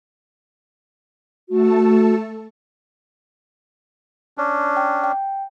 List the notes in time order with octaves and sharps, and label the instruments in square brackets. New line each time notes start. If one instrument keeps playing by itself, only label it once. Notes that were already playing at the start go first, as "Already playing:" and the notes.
[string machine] A3 A4 [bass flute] F#4
[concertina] C#4 D4
[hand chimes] G5
G5